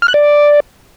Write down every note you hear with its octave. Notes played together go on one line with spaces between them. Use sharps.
F6
F#6
D5